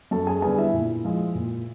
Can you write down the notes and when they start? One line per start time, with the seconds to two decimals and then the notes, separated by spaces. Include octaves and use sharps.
0.11 F#2 A4 A5
0.27 G#4 G#5
0.42 D3 G3 B3 G#4 G#5
0.58 E4 E5
0.74 A#2
1.04 F3 G#3
1.35 A#2